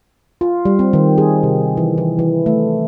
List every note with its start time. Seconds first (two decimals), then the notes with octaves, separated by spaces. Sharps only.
0.41 F4
0.65 G3
0.79 C4
0.93 D#3
1.18 G#4
1.43 C3
1.77 E3
1.98 E3
2.19 E3
2.46 A3